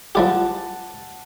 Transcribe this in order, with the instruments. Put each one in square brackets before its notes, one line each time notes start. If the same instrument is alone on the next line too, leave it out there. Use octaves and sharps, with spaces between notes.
[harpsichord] F3 G3 G4 [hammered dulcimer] F#5 A5